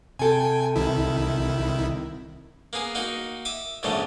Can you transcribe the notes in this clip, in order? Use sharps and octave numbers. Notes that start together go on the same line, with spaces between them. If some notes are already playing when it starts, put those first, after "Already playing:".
C3 A4 G5 G#5
C2 D#3 E4
A#3 B3 G#4
A#3 D#4 F#4
E5 D6 D#6
A#1 G#2 C#3 E3 G3 A3